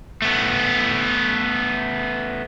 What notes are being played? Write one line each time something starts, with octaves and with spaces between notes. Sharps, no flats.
A3 B3